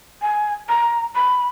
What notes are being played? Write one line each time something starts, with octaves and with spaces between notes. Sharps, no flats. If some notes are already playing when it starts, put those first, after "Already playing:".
G#5
A#5
B5